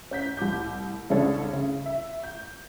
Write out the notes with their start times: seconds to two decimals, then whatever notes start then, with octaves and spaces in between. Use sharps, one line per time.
0.11 C#4 G6 B6
0.37 C2 A2 D6 G6
1.10 C2 C#3 G#3 D4 A4 C#5
1.53 C#3
1.86 E5
2.24 G6